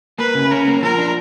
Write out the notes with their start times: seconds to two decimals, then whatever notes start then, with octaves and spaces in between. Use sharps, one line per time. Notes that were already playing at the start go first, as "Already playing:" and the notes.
0.19 A#3 B4
0.35 C#3
0.51 C#4 A#4
0.67 A#3
0.82 F3 A#4
0.98 D4